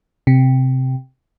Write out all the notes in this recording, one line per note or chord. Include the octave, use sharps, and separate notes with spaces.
C3